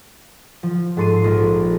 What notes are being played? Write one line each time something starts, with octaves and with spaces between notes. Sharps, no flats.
F3
G#2 A4 A5 C6 C7 D#7
A#1